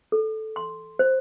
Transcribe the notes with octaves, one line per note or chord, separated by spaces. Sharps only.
A4
C6
C5